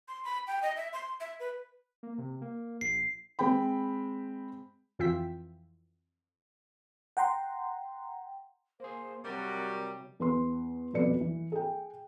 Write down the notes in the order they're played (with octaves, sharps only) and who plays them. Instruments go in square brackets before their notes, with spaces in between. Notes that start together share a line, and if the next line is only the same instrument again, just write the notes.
[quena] C6
B5
G5
D#5
E5
C6
E5
B4
[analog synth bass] A#3
C3
A#3
[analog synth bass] A#1 [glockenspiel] C7
[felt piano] G#3 C4 G5 B5
[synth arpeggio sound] F2 E3 F4 E5 G5 B6
[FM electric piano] F#5 G5 A#5 C6
[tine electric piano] A#3 G#4 [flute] C5
[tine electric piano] C3 F#3 [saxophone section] G3 [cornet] F#4 [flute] A#4
[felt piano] E2 B4 C6
D#1 F2 B2 B4 D5 C#7
E3
G#4 G5